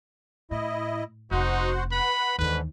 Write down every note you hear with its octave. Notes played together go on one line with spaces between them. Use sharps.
A2 E4 D#5
F1 C#4 D#4 F#4 C5 F#5
B4 F#5 B5 F#6
D#2 G#2 D3 E3 B4